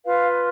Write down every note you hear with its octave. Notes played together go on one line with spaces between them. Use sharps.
F4 B4 F5